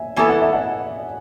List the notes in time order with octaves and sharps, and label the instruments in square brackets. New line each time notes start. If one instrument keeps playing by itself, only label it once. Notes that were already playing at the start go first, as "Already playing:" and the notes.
Already playing: [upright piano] E5 G#5
[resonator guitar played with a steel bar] E3 B3 E4 A4 [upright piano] G#5
[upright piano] F#5
E5
D#5 F#5